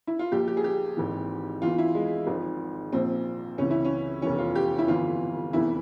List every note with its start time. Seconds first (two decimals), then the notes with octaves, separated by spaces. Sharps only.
0.07 E4
0.19 F4
0.31 A#1 A#2 F3 G4
0.48 G4
0.57 G#4
0.64 G4
0.97 G#1 G#2 E3
1.62 E2 E3 F4
1.78 E4
1.95 G#3
2.27 G#1 G#2 F3
2.92 A#1 A#2 F3 C4
3.58 C#2 C3 E3 C#4
3.71 E4
3.84 C#4
4.22 F1 E2 E3 C#4
4.39 F4
4.55 G4
4.78 E4
4.88 G1 F2 C3 E3 F4
5.53 F1 E2 C3 E3 E4